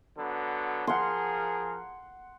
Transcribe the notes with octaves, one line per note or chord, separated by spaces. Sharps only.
D3 F#3 B3
F3 G#4 A#4 F#5 C6